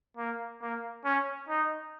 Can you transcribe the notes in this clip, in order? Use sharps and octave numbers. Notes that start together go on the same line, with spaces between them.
A#3
A#3
C#4
D#4